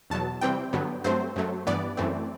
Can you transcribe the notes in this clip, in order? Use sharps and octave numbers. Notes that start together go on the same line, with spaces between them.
E2 B2 F#3 A5
C3 E3 G3 C4 G5
G2 D3 F#3 B3
G2 F#3 A3 C4 C5
F#2 F#3 A3
G2 E3 B3 D5
F#2 E3 A3 C4